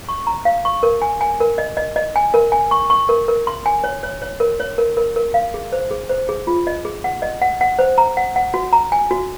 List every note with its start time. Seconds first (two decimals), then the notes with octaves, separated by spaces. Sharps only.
0.09 C#6
0.27 A#5
0.45 F5
0.65 C#6
0.83 A#4
1.02 G#5
1.21 G#5
1.40 A#4
1.58 D#5
1.77 D#5
1.96 D#5
2.16 G#5
2.34 A#4
2.52 G#5
2.71 C#6
2.90 C#6
3.09 A#4
3.28 A#4
3.47 C6
3.66 G#5
3.84 C#5
4.03 C#5
4.22 C#5
4.40 A#4
4.60 C#5
4.78 A#4
4.97 A#4
5.16 A#4
5.34 F5
5.54 G#4
5.72 C5
5.91 G#4
6.09 C5
6.29 G#4
6.47 F4
6.67 D#5
6.85 G#4
7.04 F#5
7.22 D#5
7.42 F#5
7.61 F#5
7.79 C5
7.98 A#5
8.17 F#5
8.36 F#5
8.54 F#4
8.73 A#5
8.92 G#5
9.11 F#4